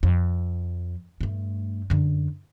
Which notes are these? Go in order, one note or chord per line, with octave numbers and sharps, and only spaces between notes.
F2
G2 A3
F#2 D3